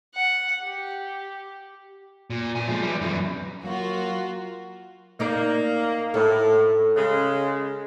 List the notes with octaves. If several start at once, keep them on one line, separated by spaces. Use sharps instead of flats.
F#5
G4
A#2
B2 G#5
F3 G#3
E3 G3
F#2 E3
F#3 A#3 F4 F#4
A#3 D#4 D5
A2 A4
C#3 G#3